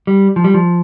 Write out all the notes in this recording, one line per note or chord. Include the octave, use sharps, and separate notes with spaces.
G3
F3
G3
F3